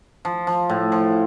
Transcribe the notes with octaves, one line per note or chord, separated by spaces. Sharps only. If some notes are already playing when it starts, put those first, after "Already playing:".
F3
F3
A2
F3